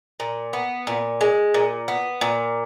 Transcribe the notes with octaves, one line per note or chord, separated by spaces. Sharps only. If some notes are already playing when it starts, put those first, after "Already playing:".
A#2
B3
A#2
G#3
A#2
B3
A#2